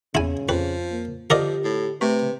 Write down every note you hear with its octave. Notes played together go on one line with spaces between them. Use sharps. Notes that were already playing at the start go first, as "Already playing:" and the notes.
E2 C#3 E4 G#5
F2 F3 B4
A#3
D3 F3 G4 A#4 D5 D#5
A2
C3 A3 B4